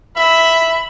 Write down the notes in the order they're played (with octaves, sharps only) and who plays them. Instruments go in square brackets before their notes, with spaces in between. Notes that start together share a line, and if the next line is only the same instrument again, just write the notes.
[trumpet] E5 [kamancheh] B5